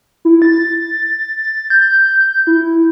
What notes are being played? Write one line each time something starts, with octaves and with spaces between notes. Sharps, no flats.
E4
A6
G6
E4